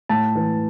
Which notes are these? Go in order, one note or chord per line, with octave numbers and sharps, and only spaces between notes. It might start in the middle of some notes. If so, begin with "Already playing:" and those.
A2 A5
E3